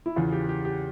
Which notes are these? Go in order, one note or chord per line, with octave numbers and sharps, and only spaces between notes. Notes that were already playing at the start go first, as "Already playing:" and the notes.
E4
E2 C#3 E3 F4
G4
G4
G4